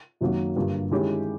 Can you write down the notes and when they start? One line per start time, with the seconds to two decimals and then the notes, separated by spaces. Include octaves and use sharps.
0.21 F#2 D#3 F#3 A#3
0.56 G2 D3 G3 A#3
0.91 D#3 G#3 C#4 E4 G4